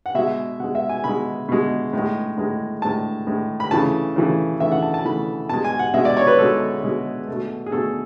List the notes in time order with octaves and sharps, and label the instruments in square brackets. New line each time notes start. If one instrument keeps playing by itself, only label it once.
[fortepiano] F#5
B2 G#3 E5
B2 F#5
G#3
E5
G#5
B2 G#3 B5
B2 G#3
A2 G#3
A2 G#3
A2 G#3 A5
A2 G#3
B5
C#3 E3 A3 A5
C#3 E3 A3
C#3 E3 A3 E5
F#5
A5
A5
C#3 E3 A3 B5
B2 A5
G#3
G#5
F#5
B2 G#3 E5
D5
C#5
B4
B2 G#3 A4
B2 G#3
B2 A3
G#4
B2 A3 A4